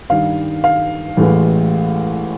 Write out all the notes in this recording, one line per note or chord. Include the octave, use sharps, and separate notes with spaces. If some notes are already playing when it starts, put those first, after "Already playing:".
G2 D#3 G3 F5
F5
A1 A2 E3 G#3